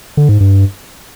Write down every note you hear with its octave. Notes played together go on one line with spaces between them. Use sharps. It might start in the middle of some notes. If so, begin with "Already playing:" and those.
D3
G#2
G2